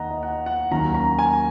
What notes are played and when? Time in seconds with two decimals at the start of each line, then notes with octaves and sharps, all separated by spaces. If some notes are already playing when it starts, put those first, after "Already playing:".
Already playing: D#2 D#3 D#5 F#5 A#5
0.11 D#5
0.23 F#5
0.46 F#5
0.71 D#2 D#3 F#3 A#3 C#4 A#5
0.95 A#5
1.19 G#5